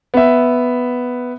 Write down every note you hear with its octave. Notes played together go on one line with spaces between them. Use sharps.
B3 E5